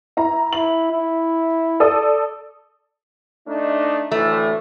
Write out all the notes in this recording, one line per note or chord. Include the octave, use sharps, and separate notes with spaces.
E4 A#5
E4 F#7
E4
A4 D5 D#6
A3 D4 D#4
D2 A2 E3 A3